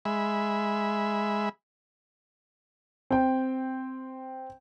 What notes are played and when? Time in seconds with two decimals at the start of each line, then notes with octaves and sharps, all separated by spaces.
0.05 G#3 E5 B5
3.11 C4 G5